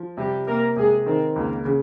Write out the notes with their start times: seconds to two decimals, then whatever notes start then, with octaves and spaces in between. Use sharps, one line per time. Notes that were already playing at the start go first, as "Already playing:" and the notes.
Already playing: F3
0.17 C3 G3 G4
0.47 C3 A#3 A#4
0.76 C3 G#3 G#4
1.06 D#3 C4
1.36 C#2 A#3
1.65 C#3